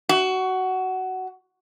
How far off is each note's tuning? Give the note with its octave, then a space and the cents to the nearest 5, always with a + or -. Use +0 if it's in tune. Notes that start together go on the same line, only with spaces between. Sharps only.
F#4 +15